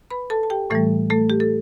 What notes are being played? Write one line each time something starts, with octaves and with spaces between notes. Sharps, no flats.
B4 B5
A4 A5
A5
G4 G5
A2 E3 G3 A3 A4
A3 A4
G4
A4